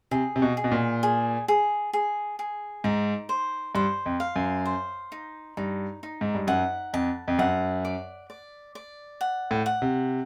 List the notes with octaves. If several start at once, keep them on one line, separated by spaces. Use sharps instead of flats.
C3 G#4
C3
B2
G#4
B2
A#2
G#4
G#4
G#4
G#4
G#2 D#4
C5
G2 C5
F2
F5
F#2
C5
D#4
G2 D#4
D#4
G#2
G2
F#2 F#5
F2 A5
F2
F#2 F#5
D5
D5
D5
F#5
A2
F#5
C3